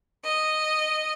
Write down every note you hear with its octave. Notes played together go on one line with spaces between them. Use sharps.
D#5